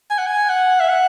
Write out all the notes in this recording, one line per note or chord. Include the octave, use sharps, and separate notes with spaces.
G#5
F#5
G#5
F#5
E5
F#5